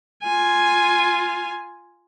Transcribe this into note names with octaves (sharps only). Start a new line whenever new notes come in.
F4 G#5